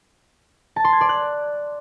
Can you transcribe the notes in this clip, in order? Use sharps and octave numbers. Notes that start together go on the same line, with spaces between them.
A5
C6
G#6
D5
F#6